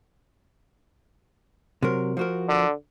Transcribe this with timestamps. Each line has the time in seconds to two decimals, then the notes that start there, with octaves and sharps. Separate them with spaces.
1.82 C3 F#3 A#4
2.17 F3 F#4 A#4
2.48 D3